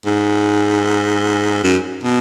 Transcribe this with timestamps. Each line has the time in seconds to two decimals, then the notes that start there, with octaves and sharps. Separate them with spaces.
0.06 G#2
1.64 F#2
2.04 B2